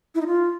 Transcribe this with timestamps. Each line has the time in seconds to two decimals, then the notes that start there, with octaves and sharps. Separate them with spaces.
0.15 E4
0.21 D#4
0.27 F4